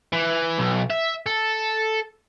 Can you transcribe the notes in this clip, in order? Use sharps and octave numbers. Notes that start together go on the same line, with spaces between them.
E3
B1
E5
A4